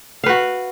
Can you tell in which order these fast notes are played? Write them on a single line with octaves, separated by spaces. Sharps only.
F5 B4 F#4